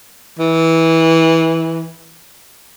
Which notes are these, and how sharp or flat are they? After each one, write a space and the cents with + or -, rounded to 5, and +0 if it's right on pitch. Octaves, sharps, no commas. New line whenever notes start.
E3 -15